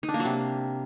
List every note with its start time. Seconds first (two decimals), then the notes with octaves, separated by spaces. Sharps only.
0.03 D#4
0.09 D4
0.14 A#3
0.20 F#3
0.25 C3